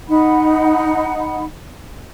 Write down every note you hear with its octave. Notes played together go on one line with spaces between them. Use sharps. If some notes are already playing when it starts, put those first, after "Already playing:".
D#4 F#5 B5